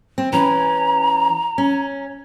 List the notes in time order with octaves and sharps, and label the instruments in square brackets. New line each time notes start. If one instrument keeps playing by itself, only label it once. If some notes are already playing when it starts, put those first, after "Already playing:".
[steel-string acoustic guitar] C4
[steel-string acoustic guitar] E3 C#4 [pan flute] A#5
[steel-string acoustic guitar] C#4